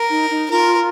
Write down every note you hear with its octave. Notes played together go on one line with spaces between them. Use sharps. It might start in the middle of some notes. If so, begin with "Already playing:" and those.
Already playing: A#4
D#4
D#4
F4 A#4